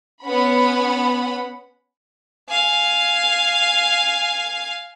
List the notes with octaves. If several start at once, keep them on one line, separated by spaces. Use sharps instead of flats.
B3 C#4 F#5 B5
F5 G#5